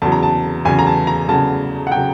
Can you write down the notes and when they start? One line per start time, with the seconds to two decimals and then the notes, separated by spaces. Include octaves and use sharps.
0.02 E2 C#3 F#3 A5
0.12 A#5
0.23 A5
0.65 E2 C#3 F#3 G#5
0.79 A#5
0.87 A5
1.07 A#5
1.28 E2 C#3 F#3 A5
1.87 F#5
1.92 C#3 F#3 G5